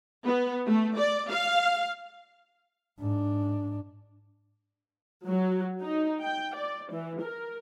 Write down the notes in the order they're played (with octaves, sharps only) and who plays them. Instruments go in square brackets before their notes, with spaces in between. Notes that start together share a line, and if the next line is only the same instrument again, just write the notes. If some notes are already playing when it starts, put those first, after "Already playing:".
[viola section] B3
A3
D5
F5
[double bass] G#2 D4
[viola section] F#3
D#4
G5
D5
E3
A#4